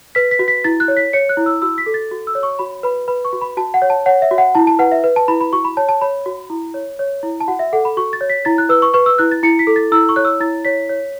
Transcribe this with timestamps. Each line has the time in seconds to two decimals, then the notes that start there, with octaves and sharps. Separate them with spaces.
0.15 B4 B6
0.31 B6
0.39 F#4
0.48 B6
0.64 E4 A6
0.80 F#6
0.88 C#5
0.97 B6
1.13 C#5 C#7
1.29 F#6
1.37 E4
1.46 E6
1.62 F#4 E6
1.78 B6
1.86 A4
1.94 A6
2.11 F#4
2.27 E6
2.35 C#5
2.43 C#6
2.59 F#4 B5
2.83 B4 B5
3.08 B4 B5
3.25 C#6
3.33 F#4
3.41 B5
3.57 F#4 A5
3.74 F#5
3.82 C#5
3.90 A5
4.06 C#5 F#5
4.22 E5
4.31 F#4
4.38 F#5
4.55 E4 A5
4.67 A5
4.79 B4 F#5
4.92 E5
5.04 B4
5.16 A5
5.28 E4 B5
5.40 B5
5.53 F#4 C#6
5.65 B5
5.77 C#5 A5
5.89 A5
6.01 C#5 B5
6.26 F#4
6.50 E4
6.74 C#5
6.99 C#5
7.23 E4
7.40 A5
7.48 F#4 F#5
7.59 E5
7.73 A4 F#5
7.85 B5
7.97 F#4 C#6
8.13 A6
8.21 C#5
8.30 B6
8.45 E4 A6
8.58 F#6
8.69 B4 E6
8.82 C#6
8.94 B4 C#6
9.06 E6
9.18 E4 F#6
9.31 A6
9.43 E4 C#7
9.59 B6
9.67 A4
9.76 A6
9.92 E4 E6
10.09 C#6
10.16 C#5 F#6
10.25 E6
10.40 E4 A6
10.65 C#5 B6
10.89 C#5